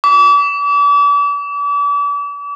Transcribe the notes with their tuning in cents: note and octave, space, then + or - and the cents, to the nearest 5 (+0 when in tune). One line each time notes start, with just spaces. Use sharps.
D6 -40